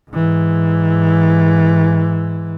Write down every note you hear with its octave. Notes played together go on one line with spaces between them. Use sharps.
G#2 E3